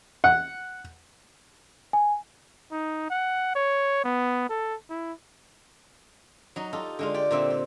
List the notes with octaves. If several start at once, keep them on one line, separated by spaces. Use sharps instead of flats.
F#5
G#5
D#4
F#5
C#5
B3
A4
E4
F#3 D#4
D#4 F4 G4 A4
D3 G#3 F4
G4 D5
A#2 D3 C4 E5
G4